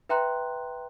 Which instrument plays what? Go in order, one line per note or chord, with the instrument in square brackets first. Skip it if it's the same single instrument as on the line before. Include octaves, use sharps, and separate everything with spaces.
[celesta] B4 E5 G5 A#5 C6 F#6